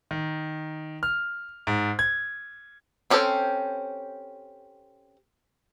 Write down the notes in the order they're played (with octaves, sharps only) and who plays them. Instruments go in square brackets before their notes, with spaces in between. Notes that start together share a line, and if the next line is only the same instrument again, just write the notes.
[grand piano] D#3
F6
G#2
G#6
[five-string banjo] C4 C#4 G4 A4 C5